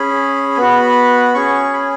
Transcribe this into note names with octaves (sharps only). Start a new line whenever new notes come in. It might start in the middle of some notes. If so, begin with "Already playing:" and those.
Already playing: C#4 G#4 B5
B3 F#4
C#4 G#4 C#6
B5